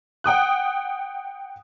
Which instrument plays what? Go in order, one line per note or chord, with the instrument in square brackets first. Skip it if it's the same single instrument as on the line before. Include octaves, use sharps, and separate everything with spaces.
[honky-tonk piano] F#5 G5 D#6 F#6